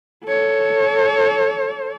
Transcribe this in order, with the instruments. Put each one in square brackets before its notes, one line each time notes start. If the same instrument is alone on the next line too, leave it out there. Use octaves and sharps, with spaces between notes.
[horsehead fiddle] A4 C#5